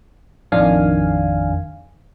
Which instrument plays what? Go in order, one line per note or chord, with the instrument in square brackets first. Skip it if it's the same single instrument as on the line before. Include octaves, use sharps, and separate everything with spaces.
[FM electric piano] A1 F2 D#3 D4 F5 G#5